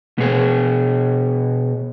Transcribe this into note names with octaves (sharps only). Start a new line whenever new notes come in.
B2 G#4